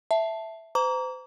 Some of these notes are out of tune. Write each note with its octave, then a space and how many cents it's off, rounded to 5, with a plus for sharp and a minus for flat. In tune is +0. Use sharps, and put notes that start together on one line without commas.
E5 +0 A5 +0
C5 -40 A#5 +0 D6 -40